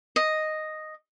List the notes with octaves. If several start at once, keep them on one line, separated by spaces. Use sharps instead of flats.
D#5